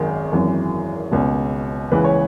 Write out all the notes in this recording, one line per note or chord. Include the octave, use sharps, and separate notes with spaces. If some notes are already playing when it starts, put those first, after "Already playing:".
Already playing: G#1 F#2 D#3 G#4
G#1 F#2 E3
C#2 B2
C#2 C#3 E3 B4
C#5